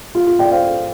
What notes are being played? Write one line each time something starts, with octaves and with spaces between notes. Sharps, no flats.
F4
F4
D5 G5
C5 F5